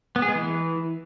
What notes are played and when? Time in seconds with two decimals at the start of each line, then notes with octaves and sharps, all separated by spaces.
0.16 B3
0.22 G#4
0.29 G#3
0.35 E3